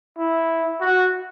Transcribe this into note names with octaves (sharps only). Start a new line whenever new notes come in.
E4
F#4